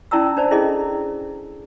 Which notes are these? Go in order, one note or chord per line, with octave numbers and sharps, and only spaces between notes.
C#4 E4 D5 A5 A#5 E6
D4 C5 D5 A5
C#4 E4 G#4 A4 D#5